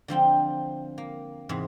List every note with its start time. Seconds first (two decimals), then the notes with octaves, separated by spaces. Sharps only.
0.08 D3 F3 C4 G5
0.98 A#3
1.49 E2 G#2 C3